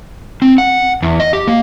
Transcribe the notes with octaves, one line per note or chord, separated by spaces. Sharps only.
C4
F#5
E2
D#5
G4
A#3